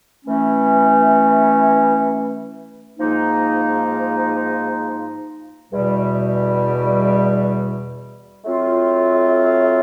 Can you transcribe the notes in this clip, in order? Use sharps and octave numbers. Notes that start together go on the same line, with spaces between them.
E3 A3 C#4
G#2 F3 A#3 D#4
E2 B2 G3
F#3 A3 C4 F4